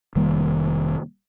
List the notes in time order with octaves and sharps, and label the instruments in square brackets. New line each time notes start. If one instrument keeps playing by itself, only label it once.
[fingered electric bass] F1 D#3 G3 A#3